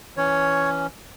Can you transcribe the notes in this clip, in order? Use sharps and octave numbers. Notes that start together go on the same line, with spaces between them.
E3 C#4 C#5